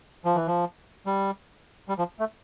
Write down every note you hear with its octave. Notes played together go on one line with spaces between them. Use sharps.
F3
E3
F3
G3
G3
F3
A3